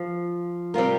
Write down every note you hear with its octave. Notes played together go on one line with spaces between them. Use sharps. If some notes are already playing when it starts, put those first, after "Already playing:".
Already playing: F3
C3 G3 C4 F4 A#4